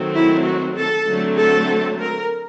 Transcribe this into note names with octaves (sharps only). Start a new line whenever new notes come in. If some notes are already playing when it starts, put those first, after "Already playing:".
Already playing: D#3 F#3 A3 C4
E4
F#4
A4
D3 F#3 A3 C4
A4
A#4